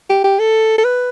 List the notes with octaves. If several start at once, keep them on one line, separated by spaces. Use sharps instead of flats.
G4
G4
A4
A4
B4